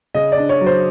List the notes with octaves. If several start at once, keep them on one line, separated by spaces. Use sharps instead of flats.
C#3 D#5
D5
D4
C#5
F#3
C5